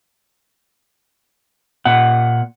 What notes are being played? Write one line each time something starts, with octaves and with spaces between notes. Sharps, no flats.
A#2 F#5